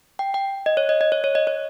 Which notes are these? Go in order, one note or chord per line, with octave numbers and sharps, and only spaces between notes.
G5
G5
D#5
C#5
D#5
D#5
C#5
C#5
D#5
C#5